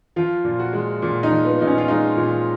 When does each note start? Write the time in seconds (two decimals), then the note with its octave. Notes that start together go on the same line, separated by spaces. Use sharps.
0.16 F3 F4
0.44 A#2
0.59 F#4
0.73 G#3
1.02 A#2
1.23 D#4
1.31 F3
1.45 B3
1.60 A#2 D#4
1.67 C#4
1.78 F4
1.88 G#3 D#4
2.17 A#2